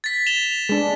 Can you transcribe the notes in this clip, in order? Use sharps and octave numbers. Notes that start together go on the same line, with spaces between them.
A6 B6
E7 F7 G7
G#3 D4